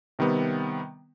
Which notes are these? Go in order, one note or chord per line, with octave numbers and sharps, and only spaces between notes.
C3 D#3 G3 B3